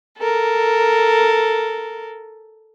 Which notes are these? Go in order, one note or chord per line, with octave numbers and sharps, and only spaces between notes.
A4 A#4